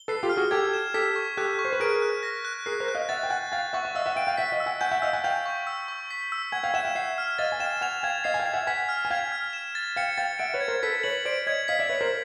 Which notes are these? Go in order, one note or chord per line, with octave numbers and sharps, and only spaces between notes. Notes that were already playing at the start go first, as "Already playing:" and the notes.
Already playing: G7
A4 B4 C7
F4 G4
F6
F#4 G#4
G4 A4 G#6
E7
G4 A4 B6
C#6
G4 A4 F#6
C#6
C5
B4
G#4 A#4 D7
F#6
A#6
F#6
G#4 A#4 C7
A#4 C5
F#6
D#5 F5
E5 F#5 A6
G5
F#5 G#5 F#6
F5 G5 A6
E5 F#5 C#6
E5
D#5 F5 E6
E5 F#5
F5 G5 D7
F5 G5
E5 F#5 B6
D#5 F5
E6
F#5 G#5
F#5 G#5 G6
E5 F#5
D#5 F5 E6
F#5 G#5
F5 G5 G6
C#6
E6
C#6
B6
E6
F#5 G#5 G#6
F5 G5
E5 F#5 E7
F5 G5
E5 F#5 C7
F6
D#5 F5 A6
G#5
F5 G5 E7
F#5 G#5 F7
F5 G5 G#6
D#5 F5 C7
G#5
F5 G5
G#6
E5 F#5
F#5 G#5 B6
F6
G#5
F5 G5 G#6
F6
E7
A6
F5 G5 C#7
F5 G5 A6
E5 F#5 D7
B4 C#5
G#6
A#4 C5
A4 B4 B6
B4 C#5 F#7
C5 D5 D7
C#5 D#5 G#6
D#5 F5 B6
D5 E5
B4 C#5 F#7
A#4 C5